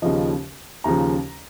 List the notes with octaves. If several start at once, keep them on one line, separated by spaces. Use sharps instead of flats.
D#2 C#3 F3 D#5
D#2 C#3 F3 A#5